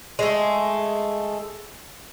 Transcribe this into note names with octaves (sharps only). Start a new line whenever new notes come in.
G#3 A3